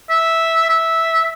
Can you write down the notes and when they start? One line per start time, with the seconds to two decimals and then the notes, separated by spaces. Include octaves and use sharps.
0.10 E5
0.69 E5